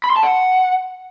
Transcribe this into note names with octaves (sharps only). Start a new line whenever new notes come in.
B5
C6
A5
F#5